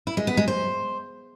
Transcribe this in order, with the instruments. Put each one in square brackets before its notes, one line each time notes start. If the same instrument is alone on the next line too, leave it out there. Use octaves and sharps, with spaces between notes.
[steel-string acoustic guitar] E4
G#3
B3
G#3
C5